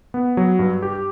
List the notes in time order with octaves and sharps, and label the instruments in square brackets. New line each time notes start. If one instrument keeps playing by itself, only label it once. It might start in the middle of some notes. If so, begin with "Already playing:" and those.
[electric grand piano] B3
F#3
G2
G4